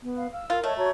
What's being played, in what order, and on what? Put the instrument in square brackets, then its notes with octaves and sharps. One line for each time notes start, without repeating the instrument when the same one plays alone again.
[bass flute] B3
[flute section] F5 B5
[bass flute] F5 [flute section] E6
[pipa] F4 [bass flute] A#4
[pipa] A3 [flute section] C#5 D#5 A5
[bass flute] F#4 [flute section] C#5 A5 A#5